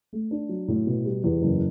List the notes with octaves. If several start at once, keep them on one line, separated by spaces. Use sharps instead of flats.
A3
D4
F#3
A2
B2
G3
E2
F#1